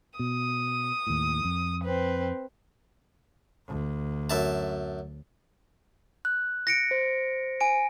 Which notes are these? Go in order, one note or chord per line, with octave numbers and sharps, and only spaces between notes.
B2 D#6
D#2 A2
F2
C4 B4
D2
F#2 E5 A5
F#6
A#6 C#7 D7
C5
G#5 D7